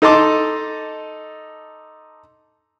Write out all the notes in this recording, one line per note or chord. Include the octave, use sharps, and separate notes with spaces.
D#4 A4 D#5 A5 C6 D6